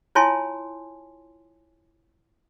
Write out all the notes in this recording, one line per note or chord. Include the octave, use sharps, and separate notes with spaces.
E4 F4 C#5 G#5 A5 C6